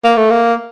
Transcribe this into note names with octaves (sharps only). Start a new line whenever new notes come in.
A#3
A3
A#3